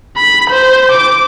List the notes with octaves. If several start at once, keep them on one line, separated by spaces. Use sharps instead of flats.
B5
C5
D6